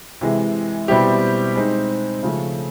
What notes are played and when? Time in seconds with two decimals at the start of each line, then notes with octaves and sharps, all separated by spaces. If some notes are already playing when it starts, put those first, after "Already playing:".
0.21 C3 E3 G#3
0.88 B2 G3 C4 E4 G4
1.56 G#3 C4 D#4
2.23 C#3 F3 A3